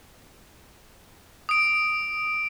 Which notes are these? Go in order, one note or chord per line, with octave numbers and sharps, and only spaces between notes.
D#6 D7